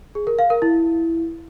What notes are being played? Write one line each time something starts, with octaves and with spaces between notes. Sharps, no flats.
G#4
A#4
F5
A#4
E4